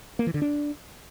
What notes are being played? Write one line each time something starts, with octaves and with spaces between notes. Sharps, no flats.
A#3
E3
D3
D4